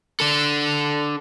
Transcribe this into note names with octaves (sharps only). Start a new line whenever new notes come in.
D4 A4